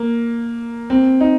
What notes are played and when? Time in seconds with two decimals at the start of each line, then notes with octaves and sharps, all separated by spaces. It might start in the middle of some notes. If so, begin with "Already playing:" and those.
Already playing: A#3
0.90 C4
1.20 D#4